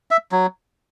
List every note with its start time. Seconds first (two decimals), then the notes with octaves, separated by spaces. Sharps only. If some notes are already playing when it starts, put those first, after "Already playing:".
0.11 E5
0.32 F#3